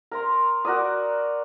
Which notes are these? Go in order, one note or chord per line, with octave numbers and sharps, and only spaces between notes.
A#4 A#5 C6
F#4 A#4 D5 D#6